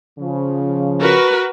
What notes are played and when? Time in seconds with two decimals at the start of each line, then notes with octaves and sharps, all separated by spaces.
0.19 C#3 F3
1.00 F#4 A#4 B4